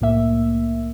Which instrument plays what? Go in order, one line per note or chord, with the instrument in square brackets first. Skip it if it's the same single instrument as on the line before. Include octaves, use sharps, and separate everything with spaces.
[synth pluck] C2 A2 A#3 E5